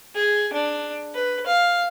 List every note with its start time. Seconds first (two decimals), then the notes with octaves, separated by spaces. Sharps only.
0.15 G#4
0.53 D4
1.15 B4
1.46 F5